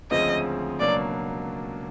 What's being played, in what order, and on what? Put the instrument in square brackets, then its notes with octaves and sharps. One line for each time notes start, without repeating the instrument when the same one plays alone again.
[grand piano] D2 C#3 F3 G#3 C4 [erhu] D#5
[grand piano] C#2 B2 F#3 A#3 D4 [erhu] D5